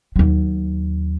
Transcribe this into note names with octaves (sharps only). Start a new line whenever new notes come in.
D#2 F#3